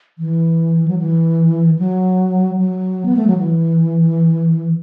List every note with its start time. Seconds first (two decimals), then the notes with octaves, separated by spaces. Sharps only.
0.19 E3
0.88 F#3
0.99 E3
1.79 F#3
2.59 F#3
3.05 B3
3.16 A3
3.27 F#3
3.38 E3